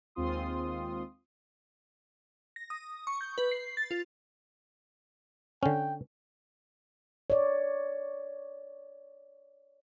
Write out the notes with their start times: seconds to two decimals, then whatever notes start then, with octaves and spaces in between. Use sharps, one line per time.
0.15 D#2 G#3 C4 F4 C6 D#6
2.56 A#6
2.70 D#6
3.07 C#6
3.21 G6
3.38 B4
3.51 C7
3.77 A6
3.91 F4
5.63 D3 C#4 G5
7.30 C#5 D5